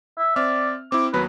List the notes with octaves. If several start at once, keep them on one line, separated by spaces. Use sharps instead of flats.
E5
C4 D5 E5 F6
C4 E4 D6
D#2 F#3 B3 B4